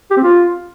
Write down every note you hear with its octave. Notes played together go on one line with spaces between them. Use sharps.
G4
C4
F4